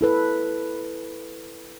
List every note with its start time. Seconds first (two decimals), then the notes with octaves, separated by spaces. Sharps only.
0.01 E4 A4 B4